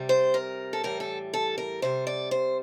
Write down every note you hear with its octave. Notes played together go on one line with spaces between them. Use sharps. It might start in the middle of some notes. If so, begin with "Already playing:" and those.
Already playing: C3 G3
C5
A#4
A4
A2 E3 G3 A#4
A4
A4
A#4
C3 G3 C5
D5
C5